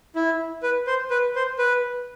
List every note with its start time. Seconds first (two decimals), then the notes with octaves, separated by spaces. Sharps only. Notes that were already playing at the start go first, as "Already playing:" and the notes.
0.15 E4
0.63 B4
0.87 C5
1.10 B4
1.36 C5
1.58 B4